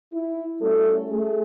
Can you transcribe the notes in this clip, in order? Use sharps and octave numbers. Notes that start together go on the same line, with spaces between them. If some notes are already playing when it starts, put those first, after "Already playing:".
E4
G3 A3 C#4 E4 F#4 A4
A3 G#4